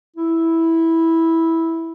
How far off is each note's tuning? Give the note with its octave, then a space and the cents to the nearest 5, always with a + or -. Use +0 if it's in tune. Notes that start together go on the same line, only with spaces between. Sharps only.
E4 -10